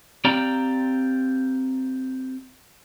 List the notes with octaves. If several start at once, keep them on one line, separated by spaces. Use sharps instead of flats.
C4 G4 D5 F5 G5 A#5